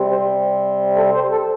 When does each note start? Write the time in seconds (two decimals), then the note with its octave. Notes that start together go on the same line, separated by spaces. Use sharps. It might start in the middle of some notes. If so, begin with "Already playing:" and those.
Already playing: C3 G3 C4
0.11 C5
0.96 A4
1.14 C5
1.31 A4